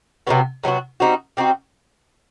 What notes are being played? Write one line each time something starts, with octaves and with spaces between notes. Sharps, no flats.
C3 F#3 B3 F#4
C3 F#3 B3 F#4
G3 C4 D#4 F#4
G3 C4 D#4 F#4